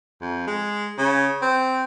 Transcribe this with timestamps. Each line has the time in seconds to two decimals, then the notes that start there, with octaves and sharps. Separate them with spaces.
0.21 F2
0.47 G#3
0.98 C#3
1.42 C4